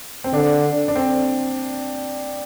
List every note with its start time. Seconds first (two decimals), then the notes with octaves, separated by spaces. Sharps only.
0.24 C4
0.33 D3 D4
0.88 D4
0.96 C4